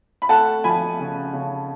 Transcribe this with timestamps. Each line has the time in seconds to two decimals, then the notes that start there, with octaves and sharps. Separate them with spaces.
0.22 B5
0.29 A3 F#5 A5
0.64 F3 G#5 B5
0.99 C#3
1.33 C#3